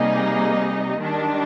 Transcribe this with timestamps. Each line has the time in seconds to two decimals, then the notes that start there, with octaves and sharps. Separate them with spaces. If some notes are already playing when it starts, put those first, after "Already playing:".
Already playing: C3 G3 A#3 D#4 G#4
0.99 D#3 G3 D4